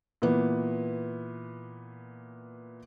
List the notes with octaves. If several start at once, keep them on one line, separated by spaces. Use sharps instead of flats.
A#2 E3 B3